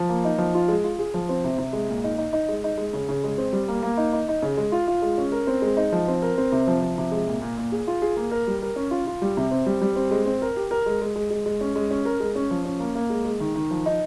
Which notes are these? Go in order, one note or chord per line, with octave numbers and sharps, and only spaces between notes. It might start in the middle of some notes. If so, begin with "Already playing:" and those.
Already playing: F3
A#3
D#4
F3
F4
G#3
F4
G#4
F3
C4
C3
C3
G#3
A#2
D#4
D#4
D#4
G#3
D#4
G#3
C#3
C#3
G#3
C4
G3
A#3
A#3
D#4
D#4
D#4
C#3
G#3
F4
F4
G#3
C#4
A#4
C4
G#3
D#4
F3
C4
A#4
C4
C3
F3
F3
C3
G#3
A#2
A#2
A#2
G#4
F4
G#4
A#3
A#4
G3
A#4
C#4
F4
F4
G3
C3
C4
G3
G3
C4
G#3
C4
A#4
G4
A#4
G#3
G#3
G#3
G#3
G#3
C#4
G#3
C#4
A#4
G#3
C#4
F3
C#4
A#3
A#3
G#3
G#3
D#3
D#3
F3
D#4